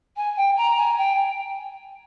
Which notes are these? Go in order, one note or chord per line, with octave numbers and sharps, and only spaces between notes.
G#5
G5
A#5
G#5
G5